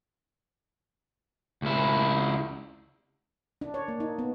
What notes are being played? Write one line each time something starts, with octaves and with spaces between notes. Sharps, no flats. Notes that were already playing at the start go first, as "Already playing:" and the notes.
C#2 E4
D4
C#5
A#3
D#4
B3